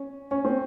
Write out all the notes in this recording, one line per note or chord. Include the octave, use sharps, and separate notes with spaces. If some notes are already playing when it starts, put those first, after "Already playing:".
Already playing: C#4
C#4
C4